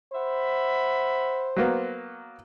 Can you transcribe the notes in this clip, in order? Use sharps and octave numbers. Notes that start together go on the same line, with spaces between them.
C5 E5 F#5 B5
F#3 A#3 B3